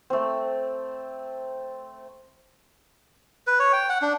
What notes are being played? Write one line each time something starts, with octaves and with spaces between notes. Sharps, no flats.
A3 C4
B4
C#5
G5
F#5
D4